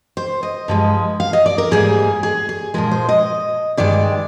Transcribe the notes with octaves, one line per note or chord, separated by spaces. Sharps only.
C5
D#5
G2 F3 G#3
F5
D#5
D5
A#4
G#2 G3 A#3 G#4
G#4
G#4
A#2 F3 G#3 A#4
C5
D#5
G2 D#3 G#3 D5